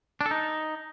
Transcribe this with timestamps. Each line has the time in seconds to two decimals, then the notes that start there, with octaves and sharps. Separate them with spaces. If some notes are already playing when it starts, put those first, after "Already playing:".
0.21 D4
0.26 A4
0.31 D#4